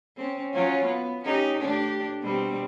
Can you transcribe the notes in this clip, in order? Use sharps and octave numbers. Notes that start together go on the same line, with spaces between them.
C4 C#4
F#3 C#4 F4
B3
C#4 D#4 G4
A2 D4 G4
B2 G3 C4